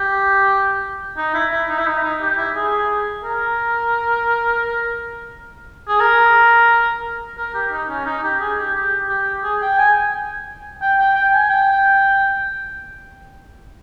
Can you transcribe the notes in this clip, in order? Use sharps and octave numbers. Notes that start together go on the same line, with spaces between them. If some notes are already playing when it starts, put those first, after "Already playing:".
Already playing: G4
D#4
E4
E4
D#4
E4
D#4
D#4
G4
E4
G#4
A#4
G#4
A#4
A#4
G4
D#4
C#4
D#4
G4
G#4
G4
G4
G4
G#4
G5
G#5
G5
G5
G5
G#5
G5